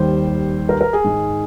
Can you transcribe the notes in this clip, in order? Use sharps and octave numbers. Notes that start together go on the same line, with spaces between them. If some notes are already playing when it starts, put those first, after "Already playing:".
Already playing: D#2 D#3 G3 C5
A#4
A#4
G#4
G#2 D#3 G#3